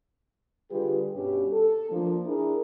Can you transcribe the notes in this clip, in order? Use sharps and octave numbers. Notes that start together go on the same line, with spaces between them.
D3 G3 F4 G4 G#4 B4
G2 B2 C#4 G4
A4
F3 A#3 D4
D4 E4 G#4 A#4